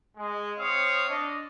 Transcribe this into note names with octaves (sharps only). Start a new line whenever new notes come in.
G#3
C4 C#5 F5 D#6
D4 D#5